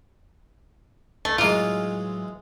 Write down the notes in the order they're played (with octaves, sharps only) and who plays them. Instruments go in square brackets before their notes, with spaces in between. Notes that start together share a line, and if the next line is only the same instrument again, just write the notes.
[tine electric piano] C2 [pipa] A3
[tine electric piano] A2 F#3 [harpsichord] E3 G#3 C#5 [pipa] A#3 F4